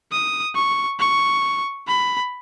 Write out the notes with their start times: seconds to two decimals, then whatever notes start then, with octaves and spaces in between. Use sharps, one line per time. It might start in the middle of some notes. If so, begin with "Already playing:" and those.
0.12 D#6
0.55 C#6
0.99 C#6
1.88 B5